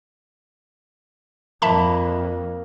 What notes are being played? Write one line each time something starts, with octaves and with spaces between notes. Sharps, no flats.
F2 A#3 E5 A5 B5